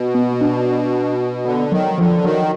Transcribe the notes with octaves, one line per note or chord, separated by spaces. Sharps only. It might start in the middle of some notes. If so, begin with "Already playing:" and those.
Already playing: B2
B3
D4
D3 B3
D#3 F#3
D3 F3
D#3 F#3